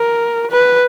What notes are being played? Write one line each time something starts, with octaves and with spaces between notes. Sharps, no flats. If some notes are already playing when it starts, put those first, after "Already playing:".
Already playing: A#4
B4